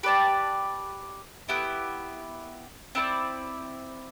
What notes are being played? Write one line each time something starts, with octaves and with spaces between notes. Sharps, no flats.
G4 B4 D5 A5
B3 E4 G4
C4 E4 B4 D5